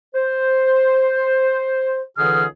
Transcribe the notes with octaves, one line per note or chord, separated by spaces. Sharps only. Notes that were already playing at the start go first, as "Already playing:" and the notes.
C5
C#2 D3 E3 D#4 G#4 F6